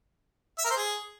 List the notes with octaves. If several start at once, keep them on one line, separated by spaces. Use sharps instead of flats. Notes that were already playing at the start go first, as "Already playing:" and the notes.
E5
A#4
C5
G#4